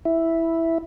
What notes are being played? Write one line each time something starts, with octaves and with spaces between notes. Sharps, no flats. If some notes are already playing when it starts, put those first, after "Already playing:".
E4